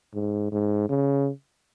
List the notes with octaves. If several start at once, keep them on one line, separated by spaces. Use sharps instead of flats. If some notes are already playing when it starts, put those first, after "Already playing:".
G#2
G#2
C#3